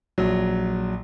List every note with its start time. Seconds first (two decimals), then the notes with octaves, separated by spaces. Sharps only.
0.18 A#1 F#3